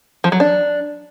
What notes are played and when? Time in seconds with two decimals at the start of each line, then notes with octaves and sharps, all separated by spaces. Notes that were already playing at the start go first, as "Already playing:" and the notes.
0.24 F3
0.32 F#3
0.40 D4